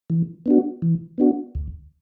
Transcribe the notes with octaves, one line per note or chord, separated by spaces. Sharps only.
E3
B3 D4 F#4
E3
B3 D4 F#4
D2